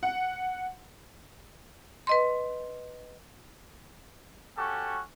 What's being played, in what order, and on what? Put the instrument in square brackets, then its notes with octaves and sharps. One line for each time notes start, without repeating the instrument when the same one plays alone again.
[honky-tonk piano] F#5
[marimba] B4 D#5 C6
[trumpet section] C#4 F#4 G4 A4